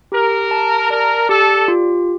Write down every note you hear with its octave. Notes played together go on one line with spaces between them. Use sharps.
G4 A#4
A5
A#4 D5
G4 A4
F4